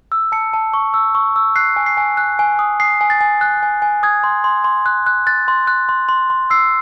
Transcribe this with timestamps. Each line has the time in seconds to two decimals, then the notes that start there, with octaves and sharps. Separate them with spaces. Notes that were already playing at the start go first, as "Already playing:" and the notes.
0.12 E6
0.32 A5 C#7
0.54 A5
0.74 C#6
0.94 E6
1.15 C#6
1.36 E6
1.56 F#6 C7
1.76 G#5
1.86 C7
1.97 G#5
2.17 F#6
2.39 G#5
2.59 D#6
2.80 D#6 C7
3.01 G#5
3.10 A6
3.21 G#5
3.41 F#6
3.63 G#5
3.82 G#5
4.03 D#6 G#6
4.24 C6
4.44 C6
4.64 C6
4.86 F#6
5.06 F#6
5.27 F#6 A6
5.48 C6
5.67 F#6
5.89 C6
6.09 C6
6.30 C6
6.50 E6 C7